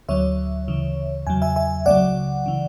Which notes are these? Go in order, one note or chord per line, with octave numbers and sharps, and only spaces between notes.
D2 D3 F#3 C#5 E5
D2 C#3 E3
E2 C#3 F#3 G#5
E5 G#5
E5 G#5
C#2 C#3 F#3 D5 F#5
C#3 E3